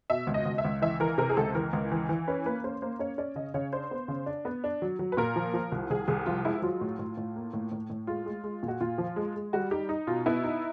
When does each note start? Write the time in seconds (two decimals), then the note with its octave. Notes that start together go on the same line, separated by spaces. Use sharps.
0.10 B2 E5
0.27 C#2
0.34 D#5
0.45 C#2
0.58 E5
0.65 C#2
0.82 E3 E5
1.00 E3 A#4
1.18 C3 A#4
1.29 G#4
1.37 C#2 A4
1.55 E3 A#4
1.73 C#2
1.92 E3
2.09 E3
2.28 C#4 B4
2.45 A#3 B4
2.64 C#4 C5
2.82 A#3 C5
2.99 C#4 C#5
3.18 C#4 D5
3.36 C#3 D#5
3.54 C#3 C#5
3.73 D4 C5
3.91 B3
4.08 C#3
4.26 D4
4.45 B3
4.64 D4
4.82 F#3
4.99 F#3
5.12 B4
5.17 A#2 A#4
5.36 F3
5.54 F3
5.72 C2
5.90 C2 G#4
6.08 C2 G#4
6.26 F3 F4
6.44 G#3 E4
6.62 F#3 F4
6.81 A2
6.99 A2
7.17 A2
7.36 A#3
7.53 A2
7.72 A2
7.90 A2
8.07 G#3 F4
8.26 G#3
8.44 G#3
8.63 A#2
8.68 F#4
8.81 A#2 F4
8.98 F3
9.16 G#3
9.36 G#3
9.53 G3 F#4
9.71 D#4 G4
9.89 D#4
10.07 B2 F4
10.26 B3 E4
10.44 D#4